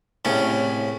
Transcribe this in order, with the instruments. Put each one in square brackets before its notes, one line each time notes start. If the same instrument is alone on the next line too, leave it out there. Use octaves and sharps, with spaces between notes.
[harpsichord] C2 A2 C#3 C#4